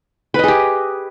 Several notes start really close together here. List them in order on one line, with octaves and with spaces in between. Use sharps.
B4 D#5 G#4 G4